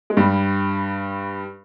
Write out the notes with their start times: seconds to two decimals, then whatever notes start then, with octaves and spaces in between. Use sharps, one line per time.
0.10 G#3
0.17 G2 G3